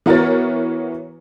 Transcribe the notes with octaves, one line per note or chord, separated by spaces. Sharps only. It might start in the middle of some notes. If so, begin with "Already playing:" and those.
E3 B3 F#4 A#4 C#5 A6